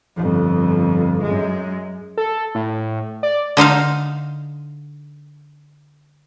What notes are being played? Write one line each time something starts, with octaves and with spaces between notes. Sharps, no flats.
G1 F2
F#2 G#3
A4
A2
D5
D3 D#4 C5 F5